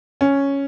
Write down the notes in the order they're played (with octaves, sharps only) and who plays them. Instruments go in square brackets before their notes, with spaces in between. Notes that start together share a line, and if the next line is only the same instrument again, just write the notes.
[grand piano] C#4